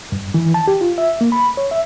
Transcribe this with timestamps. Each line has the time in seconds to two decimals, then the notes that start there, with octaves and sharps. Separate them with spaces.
0.12 G2
0.34 E3
0.54 A5
0.67 G4
0.81 F4
0.98 E5
1.21 A#3
1.32 B5
1.57 C#5
1.71 E5